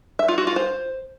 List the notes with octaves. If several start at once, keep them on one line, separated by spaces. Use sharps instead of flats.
E5
F4
F#4
F4
C5